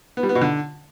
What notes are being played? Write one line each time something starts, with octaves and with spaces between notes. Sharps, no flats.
B3
G3
B3
B2
D3